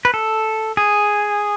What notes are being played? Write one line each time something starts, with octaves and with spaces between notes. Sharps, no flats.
B4
A4
G#4